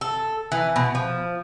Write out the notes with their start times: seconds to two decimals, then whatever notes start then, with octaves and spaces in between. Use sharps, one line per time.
0.01 A4
0.52 E3
0.76 B2
0.95 F3